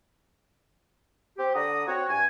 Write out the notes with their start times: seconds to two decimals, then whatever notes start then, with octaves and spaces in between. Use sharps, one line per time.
1.37 C4 G4
1.55 D3 D5 F#5 A#5 D#6
1.87 C4 F#4 C#5
2.08 G2 G#5